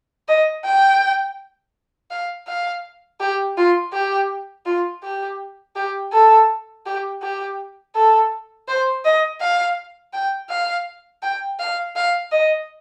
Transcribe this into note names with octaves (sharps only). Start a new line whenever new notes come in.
D#5
G5
F5
F5
G4
F4
G4
F4
G4
G4
A4
G4
G4
A4
C5
D#5
F5
G5
F5
G5
F5
F5
D#5